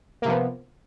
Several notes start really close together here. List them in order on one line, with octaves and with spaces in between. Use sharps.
A#3 C3 F3 B3